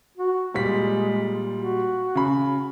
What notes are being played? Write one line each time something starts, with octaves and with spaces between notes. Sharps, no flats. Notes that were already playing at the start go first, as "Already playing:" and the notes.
F#4
A#2 G3 G#3 B6
F#4
C#3 B5